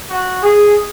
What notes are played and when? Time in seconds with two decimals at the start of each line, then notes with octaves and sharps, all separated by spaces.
0.08 F#4
0.43 G#4